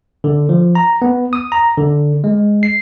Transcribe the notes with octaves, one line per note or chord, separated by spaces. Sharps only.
D3
F3
A#5
B3
D#6
A#5
D3
G#3
C7